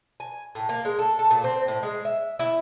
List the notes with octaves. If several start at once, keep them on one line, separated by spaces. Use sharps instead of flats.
G#5
A2
A#3
G#3
A4
A4
A#2
C4
A2
G#3
E5
E4